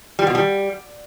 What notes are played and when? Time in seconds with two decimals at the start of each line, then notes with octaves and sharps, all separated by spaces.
0.19 G3
0.27 B2
0.35 G3